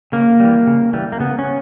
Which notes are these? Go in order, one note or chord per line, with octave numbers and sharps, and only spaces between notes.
C#3 A#3
E3 G3
C#3
E3 G3
A#3
C#3 B3
C#4